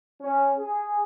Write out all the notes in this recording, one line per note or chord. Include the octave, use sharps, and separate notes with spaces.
C#4
G#4